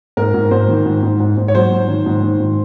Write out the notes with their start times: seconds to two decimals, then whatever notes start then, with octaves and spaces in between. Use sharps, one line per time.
0.17 G#2 A#4
0.34 G#2
0.51 G#2 C5
0.68 D#3
0.86 G#2
1.03 G#2
1.20 G#2
1.37 G#2
1.48 C#5
1.55 F#3 C5
1.71 G#2
1.89 D#3
2.06 G#2
2.23 D#3
2.40 G#2